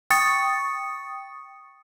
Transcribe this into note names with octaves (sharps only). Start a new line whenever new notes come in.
G5 C#6 D#6 A6 C#7